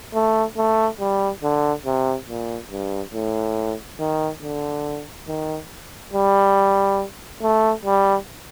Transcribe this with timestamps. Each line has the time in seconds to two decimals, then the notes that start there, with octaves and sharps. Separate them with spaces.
0.14 A3
0.57 A3
1.00 G3
1.43 D3
1.86 C3
2.28 A#2
2.71 G2
3.14 A2
4.00 D#3
4.43 D3
5.28 D#3
6.13 G3
7.42 A3
7.85 G3